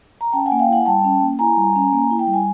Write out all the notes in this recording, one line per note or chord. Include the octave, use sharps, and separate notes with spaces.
A#5
C#4 G5 A5
F#5 G#5
A#3
F5 G5
E4 F#5 G#5
G3 G5 A5
C#4
A#3
E4 G#5 A#5
G3
C#4
A#3
E4
G5
G3
G#5